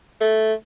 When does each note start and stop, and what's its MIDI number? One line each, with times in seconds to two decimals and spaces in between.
0.21 0.53 57